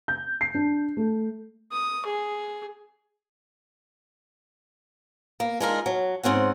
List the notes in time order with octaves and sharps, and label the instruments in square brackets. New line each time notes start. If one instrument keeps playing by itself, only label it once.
[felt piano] G6
C7
D4
A3
[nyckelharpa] D#6
G#4
[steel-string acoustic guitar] A#3
G#3 D4 D#4 F4 G#4 A#4
F#3
G#2 C4 C#4 F#5